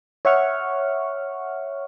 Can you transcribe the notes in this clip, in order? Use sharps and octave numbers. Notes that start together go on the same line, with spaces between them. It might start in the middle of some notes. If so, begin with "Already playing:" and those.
C#5 E5 F#5 C#6 F6